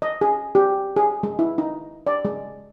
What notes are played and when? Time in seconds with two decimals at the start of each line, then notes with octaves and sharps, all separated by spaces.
0.02 D#5
0.21 G#4
0.55 G4
0.96 G#4
1.23 G#3
1.39 E4
1.58 D#4
2.07 D5
2.25 G#3